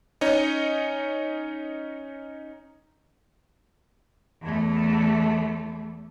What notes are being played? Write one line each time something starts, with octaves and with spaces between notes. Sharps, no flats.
C#4 D#4 C#5 D#5
E2 A3